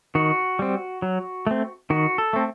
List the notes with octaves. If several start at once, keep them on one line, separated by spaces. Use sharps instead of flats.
D#3 F#4
G3 C4
F#3
A3 C4
D#3 F#4
A4
A3 C4